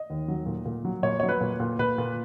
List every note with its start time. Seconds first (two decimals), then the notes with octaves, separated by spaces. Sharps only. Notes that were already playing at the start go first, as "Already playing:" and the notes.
Already playing: D#5
0.10 D#2
0.28 F#3
0.46 A#2
0.66 A#2
0.85 F#3
1.03 A#2 C#5
1.20 F#3 C#5
1.29 B4
1.41 A#2
1.60 A#2
1.79 A#2 B4
1.98 A#2